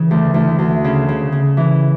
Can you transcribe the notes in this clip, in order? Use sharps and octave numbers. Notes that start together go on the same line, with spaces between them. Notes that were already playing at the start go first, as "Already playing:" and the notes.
Already playing: C#3 E3
D2
D2
D2
C#3
C#3
C#3
E3